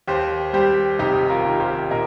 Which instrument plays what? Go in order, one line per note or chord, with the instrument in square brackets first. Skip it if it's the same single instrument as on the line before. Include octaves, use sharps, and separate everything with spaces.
[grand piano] D#2 G4 C5
G3 G4 C5
F1 D#4 G4
F4 A#4
D#3
G4 C5
A#2 A#4 D#5